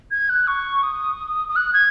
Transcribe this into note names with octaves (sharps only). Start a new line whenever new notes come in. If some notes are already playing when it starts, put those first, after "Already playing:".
G#6
F#6
C#6
D#6
D#6
F#6
G#6